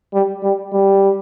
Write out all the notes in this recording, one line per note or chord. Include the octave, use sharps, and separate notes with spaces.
G3
G3
G3